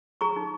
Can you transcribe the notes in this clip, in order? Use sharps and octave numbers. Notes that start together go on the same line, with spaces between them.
G#4 A#5 C#6
D#4